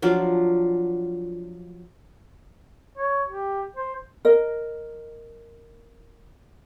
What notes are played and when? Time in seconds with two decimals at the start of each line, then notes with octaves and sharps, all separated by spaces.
0.02 F3 F#3 D4 F4
2.98 C#5
3.29 G4
3.77 C5
4.25 A#4 D#5